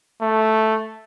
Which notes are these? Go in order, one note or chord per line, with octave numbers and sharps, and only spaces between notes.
A3